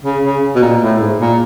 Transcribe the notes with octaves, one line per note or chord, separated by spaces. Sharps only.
C#3
C#3
B2
A#2
A2
G#2
A#2